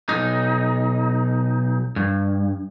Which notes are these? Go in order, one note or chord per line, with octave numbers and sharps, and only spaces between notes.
B1 D#4
G2